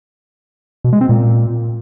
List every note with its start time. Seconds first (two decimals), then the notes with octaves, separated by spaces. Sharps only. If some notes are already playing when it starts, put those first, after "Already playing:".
0.84 B2
0.93 G#3
1.01 C4
1.09 A#2